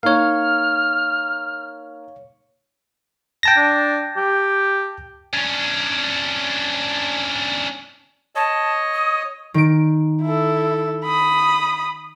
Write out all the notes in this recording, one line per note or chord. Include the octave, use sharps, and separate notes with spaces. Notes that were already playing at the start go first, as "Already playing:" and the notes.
A#3 D#4 C#5 F5 F6
G5 A5 A#6
D4
G4
C#4 D4
C#5 D#5 A5
D#6
D#3 D7
E4 A4
B5 D#6